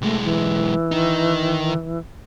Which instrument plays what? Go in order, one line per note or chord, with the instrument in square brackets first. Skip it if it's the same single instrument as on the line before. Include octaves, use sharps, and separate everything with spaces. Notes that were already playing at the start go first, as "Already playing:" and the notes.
[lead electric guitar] B1 G#3 [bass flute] A3
[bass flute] E3
[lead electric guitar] D#3 D#4